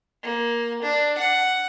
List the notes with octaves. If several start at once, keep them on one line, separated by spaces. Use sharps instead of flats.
A#3
D4
F#5